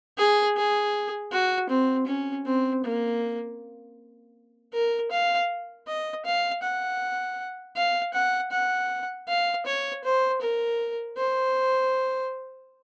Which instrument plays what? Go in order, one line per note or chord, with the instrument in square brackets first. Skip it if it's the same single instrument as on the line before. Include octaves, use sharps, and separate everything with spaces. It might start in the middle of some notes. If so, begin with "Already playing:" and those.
[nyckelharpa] G#4
G#4
F#4
C4
C#4
C4
A#3
A#4
F5
D#5
F5
F#5
F5
F#5
F#5
F5
C#5
C5
A#4
C5